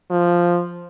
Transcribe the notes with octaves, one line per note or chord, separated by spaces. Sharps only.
F3